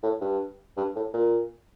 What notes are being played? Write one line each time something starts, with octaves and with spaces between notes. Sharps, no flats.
A2
G2
G2
A2
A#2